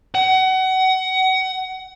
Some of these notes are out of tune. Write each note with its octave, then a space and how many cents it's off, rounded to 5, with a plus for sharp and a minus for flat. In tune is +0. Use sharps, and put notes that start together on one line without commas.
F#5 +30